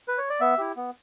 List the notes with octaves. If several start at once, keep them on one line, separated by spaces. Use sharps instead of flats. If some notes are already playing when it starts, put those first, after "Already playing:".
B4
C#5
D5
B3 E5
E4 G4
B3